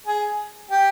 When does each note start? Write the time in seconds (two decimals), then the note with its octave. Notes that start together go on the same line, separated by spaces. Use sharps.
0.06 G#4
0.71 G4